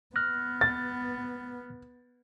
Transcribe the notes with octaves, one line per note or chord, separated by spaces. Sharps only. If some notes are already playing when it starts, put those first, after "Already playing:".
B3 F6 F#6 A#6
A6